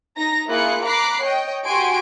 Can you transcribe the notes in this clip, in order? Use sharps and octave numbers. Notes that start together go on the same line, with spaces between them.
D#4 A#5 A#6
A#3 E4 F4 G#4 F#6 C#7
A#5 B5 D6 F#6 C7
C#5 D#5 G5
F#4 G4 G#5 C6 D7